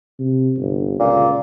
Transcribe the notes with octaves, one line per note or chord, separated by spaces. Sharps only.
C3
G1
C#2 A#2